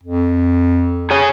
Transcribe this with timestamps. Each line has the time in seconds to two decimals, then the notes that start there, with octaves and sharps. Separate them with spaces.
0.03 F2
1.11 G#4 C#5 G#5